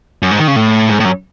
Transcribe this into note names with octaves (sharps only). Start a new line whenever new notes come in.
F#2
G#2
D#3
C#3
A2
G#2
A2
F#2